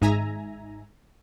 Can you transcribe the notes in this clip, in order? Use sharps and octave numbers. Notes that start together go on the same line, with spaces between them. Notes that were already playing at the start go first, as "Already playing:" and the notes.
G#1 G#2 D#4 E5 G#5 A#5